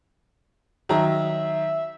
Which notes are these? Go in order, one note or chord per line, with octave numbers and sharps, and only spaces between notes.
D#3 F#3 E5 A#5